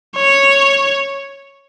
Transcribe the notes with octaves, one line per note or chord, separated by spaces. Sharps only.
C#5